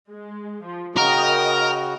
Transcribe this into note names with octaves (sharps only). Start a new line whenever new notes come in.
G#3
F3
C#3 F#4 A#4 D#5 G5